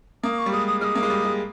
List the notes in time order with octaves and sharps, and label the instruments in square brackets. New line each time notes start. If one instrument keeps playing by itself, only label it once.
[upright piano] A#3 [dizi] D#6
[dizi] C#6
[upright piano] G3
[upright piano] G#3 [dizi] D#6
[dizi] D#6
[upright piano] G#3 [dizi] D#6 F6
[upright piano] A#3
G#3
G3
G#3